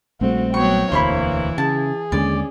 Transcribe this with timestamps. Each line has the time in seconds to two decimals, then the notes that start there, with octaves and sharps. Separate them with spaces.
0.21 A#1 G3 A3 C4 F#4
0.54 F#3 B3 C#5 G5 C#6
0.92 E1 D2 E3 A#3 E4 C5 C#5 B5
1.58 C#3 G#4 A5
2.12 D#2 D3 G#3 C#4 D5